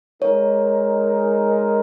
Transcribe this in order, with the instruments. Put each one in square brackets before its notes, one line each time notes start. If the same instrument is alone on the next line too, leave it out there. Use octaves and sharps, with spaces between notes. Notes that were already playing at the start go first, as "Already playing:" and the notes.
[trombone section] G#3 D#4 A#4 [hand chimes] C#5